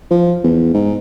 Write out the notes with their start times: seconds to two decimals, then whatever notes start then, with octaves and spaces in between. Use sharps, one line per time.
0.11 F3
0.44 E2
0.74 G#2